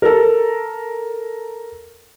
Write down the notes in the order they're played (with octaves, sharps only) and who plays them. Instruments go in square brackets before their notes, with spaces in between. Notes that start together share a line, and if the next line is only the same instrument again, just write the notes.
[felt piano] A4 A#4